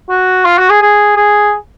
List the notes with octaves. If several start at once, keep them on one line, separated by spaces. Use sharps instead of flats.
F#4
F4
F#4
G#4
G#4
G#4